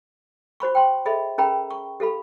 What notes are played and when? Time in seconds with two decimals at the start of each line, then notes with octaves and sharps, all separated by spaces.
0.60 F#4 C5 B5 C#6
0.75 G5 C6
1.06 G#4 A4 D#5 E5 B5
1.38 C#4 G#4 A#4 G5 A#5 B5
1.71 C#6
2.00 G4 A4 F5 B5